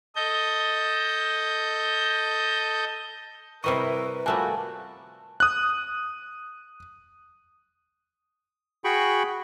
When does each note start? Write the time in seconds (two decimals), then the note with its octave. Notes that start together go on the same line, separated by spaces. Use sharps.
0.15 A4 D#5 G6
3.64 C3 G3 E4 A#4 B4 D#5 C#6
4.26 F3 G3 A3 A#3 F#4 G#5 A5 F#6
5.40 D#6 F#6
8.84 F#4 G#4 G5 B5 C#6